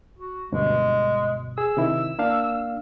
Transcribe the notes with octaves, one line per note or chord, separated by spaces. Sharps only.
F#4
D2 G2 B2 G#3
G#4 E6
C3 D#3 E4
A#3 D4 F5